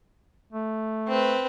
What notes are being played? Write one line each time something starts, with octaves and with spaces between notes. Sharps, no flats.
A3
C4 B4